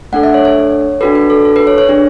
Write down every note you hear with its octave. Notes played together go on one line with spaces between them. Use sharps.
A3 D4 A4 F#5
E5
C#5
C#5
D4 F#4 A4 B4
B4
A4
A4
B4
C#5
C#5
D4 G#4